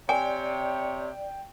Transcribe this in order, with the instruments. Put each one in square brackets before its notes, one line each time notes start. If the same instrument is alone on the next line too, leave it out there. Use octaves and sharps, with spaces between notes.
[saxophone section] C3 C#5 [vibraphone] D5 [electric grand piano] G5 [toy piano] G#5